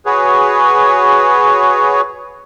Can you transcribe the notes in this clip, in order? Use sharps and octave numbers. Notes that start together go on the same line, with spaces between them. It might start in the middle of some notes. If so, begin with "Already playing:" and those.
F#4 G#4 B4 C#5